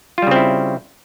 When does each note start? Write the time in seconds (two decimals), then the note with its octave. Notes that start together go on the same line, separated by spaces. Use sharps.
0.18 F4
0.22 G3
0.27 C#3
0.31 C4
0.36 E4